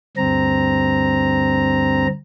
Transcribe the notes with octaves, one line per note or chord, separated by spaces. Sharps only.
D2 G2 C4 A#5